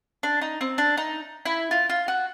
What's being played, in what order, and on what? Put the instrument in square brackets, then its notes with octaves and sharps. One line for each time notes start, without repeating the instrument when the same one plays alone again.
[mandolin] D4
D#4
C4
D4
D#4
E4
F4
F4
F#4